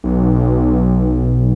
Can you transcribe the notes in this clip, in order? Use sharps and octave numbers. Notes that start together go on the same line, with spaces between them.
B1